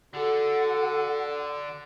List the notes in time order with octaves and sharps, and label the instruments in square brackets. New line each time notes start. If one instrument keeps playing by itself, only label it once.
[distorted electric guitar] D3 [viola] F#4 A4 [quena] F#5